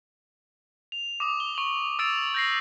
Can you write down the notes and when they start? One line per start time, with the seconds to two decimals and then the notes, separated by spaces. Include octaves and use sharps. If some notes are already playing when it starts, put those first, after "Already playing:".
0.92 F7
1.20 D6 D#6
1.40 G7
1.55 C#6 F#7
1.99 D6 E6 A6 D7 F7
2.34 G6 A#6 C7